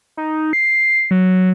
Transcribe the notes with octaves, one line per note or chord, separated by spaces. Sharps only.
D#4
C7
F#3